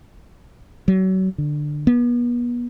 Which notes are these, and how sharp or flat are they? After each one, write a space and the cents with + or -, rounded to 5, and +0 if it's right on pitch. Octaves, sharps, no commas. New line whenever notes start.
F#3 +30
D3 +15
B3 -35